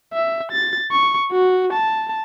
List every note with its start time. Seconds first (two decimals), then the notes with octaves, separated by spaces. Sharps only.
0.13 E5
0.52 A6
0.92 C#6
1.32 F#4
1.73 A5